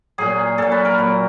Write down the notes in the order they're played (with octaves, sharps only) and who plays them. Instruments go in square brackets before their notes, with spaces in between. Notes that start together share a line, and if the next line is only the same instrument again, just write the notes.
[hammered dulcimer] A#2 F#3 G#4
A#2 F#3 A4
B4
A#4
A#2 F#3